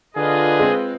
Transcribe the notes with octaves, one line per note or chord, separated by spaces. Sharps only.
D3 F4 G#4 B4 D#5
G#3 C4